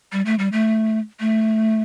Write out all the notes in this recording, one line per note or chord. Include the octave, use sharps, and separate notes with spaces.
G3
A3
G3
A3
A3